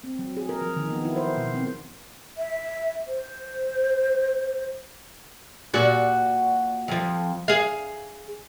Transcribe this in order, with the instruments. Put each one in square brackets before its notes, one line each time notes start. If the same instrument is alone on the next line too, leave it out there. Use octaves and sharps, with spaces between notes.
[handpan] C4
F#3
G#4
A#4
F3
D#3
B3
E4
C5
B2
C4
[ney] E5
C5
[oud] A#2 F#4 D5
F2 F3
G#4 F5